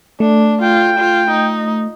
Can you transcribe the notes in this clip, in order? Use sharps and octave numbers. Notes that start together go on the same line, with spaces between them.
A3 D4
F4 G5
F4
D#4